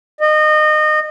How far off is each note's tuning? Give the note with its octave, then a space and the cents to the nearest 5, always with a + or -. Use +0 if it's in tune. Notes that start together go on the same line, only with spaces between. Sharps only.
D#5 -25